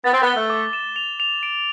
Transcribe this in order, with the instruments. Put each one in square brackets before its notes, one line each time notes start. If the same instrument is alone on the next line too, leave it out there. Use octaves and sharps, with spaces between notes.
[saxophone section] B3 [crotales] A6
[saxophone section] C4
B3
[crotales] G7
[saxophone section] A3
[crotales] D6
E7
F7
F7
D7